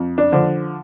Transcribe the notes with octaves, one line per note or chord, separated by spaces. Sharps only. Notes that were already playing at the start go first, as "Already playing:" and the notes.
Already playing: F2
D4
D3 F3